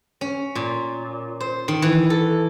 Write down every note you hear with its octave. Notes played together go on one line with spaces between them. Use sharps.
C#4
A#2
C5
D#3
E3
A4